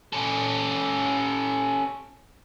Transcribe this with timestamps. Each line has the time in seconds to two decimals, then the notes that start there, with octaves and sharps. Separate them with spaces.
0.13 C#4 A4